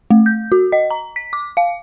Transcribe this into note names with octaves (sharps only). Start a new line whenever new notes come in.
A3
G6
F#4
D#5
A#5
B6
D6
F5